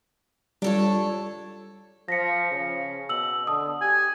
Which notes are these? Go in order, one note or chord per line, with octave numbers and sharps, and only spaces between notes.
G3 D4 F4 A4 C#5
F3 A#6 B6 C#7
C#3
B2 E6 F#7
D3 A5 D#6
G4 G#5